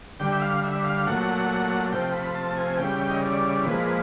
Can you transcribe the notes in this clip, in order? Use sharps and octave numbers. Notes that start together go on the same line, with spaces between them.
D3 G3 G5
E5
F5
E5
F5
A#2 F#3 A3 F#5
C3 F3 A3 G5
B5
A5
G#5
C#3 E3 G3 G5
D#5
D5
A#2 F3 G#3 B4